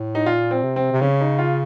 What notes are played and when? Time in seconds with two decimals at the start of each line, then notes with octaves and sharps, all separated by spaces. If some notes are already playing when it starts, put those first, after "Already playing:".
Already playing: A2
0.15 D#4
0.26 A#2 F4
0.51 C4
0.63 C3
0.76 C4
0.92 C3
1.01 C#3 C#4
1.21 D#4
1.39 F4